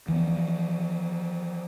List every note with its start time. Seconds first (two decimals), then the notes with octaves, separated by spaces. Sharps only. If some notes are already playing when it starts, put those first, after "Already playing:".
0.08 E3 F3 G#3 B3